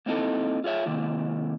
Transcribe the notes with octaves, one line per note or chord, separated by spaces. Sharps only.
A#3 C4 D#4 E4 A4
F4 G#4 C#5 E5
C3 D#3 A#3 E4